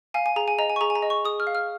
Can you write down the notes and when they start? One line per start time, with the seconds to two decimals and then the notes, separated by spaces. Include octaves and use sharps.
0.14 F5 G#5
0.26 G#5
0.36 G#4 A#5
0.48 G#5
0.59 D#5 A#5
0.70 G#5
0.76 C#6
0.81 G#4 A#5
0.90 G#5
0.95 A#5
1.02 D#5
1.10 C#6
1.25 G#4 D#6
1.40 F6
1.47 F5
1.55 F6